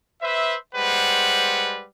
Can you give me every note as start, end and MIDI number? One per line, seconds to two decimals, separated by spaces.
0.22 0.55 71
0.22 0.55 72
0.22 0.55 76
0.75 1.85 55
0.75 1.85 56
0.75 1.85 71
0.75 1.85 72
0.75 1.85 78